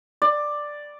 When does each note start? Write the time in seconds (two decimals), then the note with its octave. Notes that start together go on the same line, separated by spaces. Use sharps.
0.22 D5